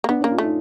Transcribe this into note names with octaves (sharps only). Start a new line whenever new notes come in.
A#3
B3 D4
A#3 C#4
F4
A3 D#4